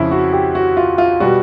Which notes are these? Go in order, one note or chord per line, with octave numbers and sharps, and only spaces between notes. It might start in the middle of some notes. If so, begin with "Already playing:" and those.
Already playing: F2 C#3 F3 C4 C#4 E4
F#4
G4
F#4
F4
F4
B2 G3 F#4